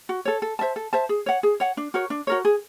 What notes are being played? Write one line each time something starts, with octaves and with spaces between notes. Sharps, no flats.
F#4
A4 C#5
A4
C5 E5 A5
A4
C5 E5 A5
G#4
C#5 F#5
G#4
C#5 F#5
D4
F#4 A#4 C#5
D4
F#4 A#4 C#5
G#4